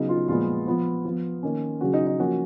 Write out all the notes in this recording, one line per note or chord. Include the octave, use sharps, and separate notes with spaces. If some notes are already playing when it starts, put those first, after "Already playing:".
Already playing: C#3 F#3 B3 D#4
F4
A#2 F3 G#3 B3 F4
F3 B3
F3 B3
D#3 A#3 C#4
C#3 F#3 C#4 F#4
D#4
D#4
F3 A#3 C#4 F#4